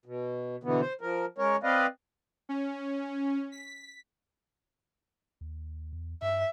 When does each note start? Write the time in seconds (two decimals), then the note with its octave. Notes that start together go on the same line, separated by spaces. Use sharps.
0.06 B2
0.64 B2 D3 E3 B3
0.81 C5
1.01 F3 A#4
1.38 G#3 C#4 A#4 C#5
1.63 C4 B4 D5 D#5 F5
2.49 C#4
3.52 B6
5.41 D#2
5.93 E2
6.22 G2 E5